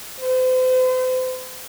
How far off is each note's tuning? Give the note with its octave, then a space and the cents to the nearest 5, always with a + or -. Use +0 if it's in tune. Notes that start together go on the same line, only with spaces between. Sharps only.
C5 -40